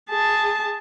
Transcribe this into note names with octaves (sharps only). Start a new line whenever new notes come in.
G#4 A5